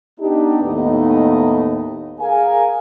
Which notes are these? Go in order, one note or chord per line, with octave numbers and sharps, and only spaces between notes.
B3 D4 D#4 G4
D#2 A2 A3 B3 D#4 D#5
G#4 A#4 F5 G#5